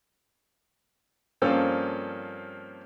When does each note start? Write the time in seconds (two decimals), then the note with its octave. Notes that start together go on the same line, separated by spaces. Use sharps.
1.42 G2 F3 A#3 C4 C#4 A4